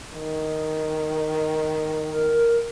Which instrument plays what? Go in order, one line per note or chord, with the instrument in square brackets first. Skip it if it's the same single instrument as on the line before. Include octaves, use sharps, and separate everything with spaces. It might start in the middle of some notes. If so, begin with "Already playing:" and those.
[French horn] D#3
[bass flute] A#4